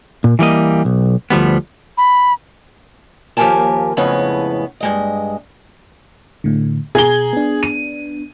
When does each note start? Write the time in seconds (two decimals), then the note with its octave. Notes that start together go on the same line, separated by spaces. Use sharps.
0.24 A#2
0.39 E3 G3 A#3 D#5
0.85 B1
1.30 D2 F3 G3 B3
1.98 B5
3.37 D#2 F3 G4 A#4 G#5 A5
3.97 F2 A2 C#3 G#3 B3 C#4
4.80 G2 G#3 D#5
6.44 A2 D3
6.95 B2 G#4 A#5 G#6 G7
7.33 B3 D4
7.63 D#7